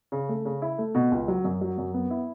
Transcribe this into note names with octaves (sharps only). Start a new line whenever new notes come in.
C#3
A3
C#3
E4
A3
B2
C#2
F#3
F#2
F#3
F#2
B3
E4